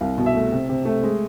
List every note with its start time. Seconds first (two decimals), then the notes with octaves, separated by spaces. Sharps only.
0.01 C2 F5
0.18 B2
0.26 E5
0.35 A3
0.52 C3
0.69 C3
0.85 A3
1.03 G#3